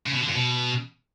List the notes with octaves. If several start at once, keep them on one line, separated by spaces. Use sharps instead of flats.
C#3
B2
D3
F2
B2